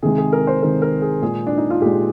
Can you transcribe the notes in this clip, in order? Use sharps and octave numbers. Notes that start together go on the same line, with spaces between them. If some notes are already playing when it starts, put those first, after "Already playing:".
C3 D#3 G#3 G#4
G#4
A#4
C5
C3 D#3 G#3 A#4
A#4
G#4
A#2 G#3 G#4
D4
D#4
F4
A#2 G#3 G4